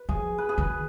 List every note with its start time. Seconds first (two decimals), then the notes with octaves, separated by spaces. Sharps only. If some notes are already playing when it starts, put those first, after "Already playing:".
Already playing: B4
0.09 F3 G#4
0.38 B4
0.49 G#4
0.58 D#3 B4